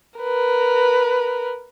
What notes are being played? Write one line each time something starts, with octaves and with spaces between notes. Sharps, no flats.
A#4 B4